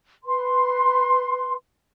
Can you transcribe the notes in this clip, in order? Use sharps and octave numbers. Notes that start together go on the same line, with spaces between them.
B4 C6